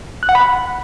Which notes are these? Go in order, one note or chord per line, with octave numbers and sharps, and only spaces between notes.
F#6
F#5
B5